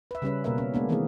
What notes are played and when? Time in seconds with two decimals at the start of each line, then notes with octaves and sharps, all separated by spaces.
0.11 B4 E5
0.22 C#3 G3 C#4 B4
0.44 B2 A#3 A#4 B4 E5
0.58 C#4
0.74 G#3 A#3 B3 D4
0.89 D#3 E3 A3 B3 C4 G#4